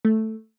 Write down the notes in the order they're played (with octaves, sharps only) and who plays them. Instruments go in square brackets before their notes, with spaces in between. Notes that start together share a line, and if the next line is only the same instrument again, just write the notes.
[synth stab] A3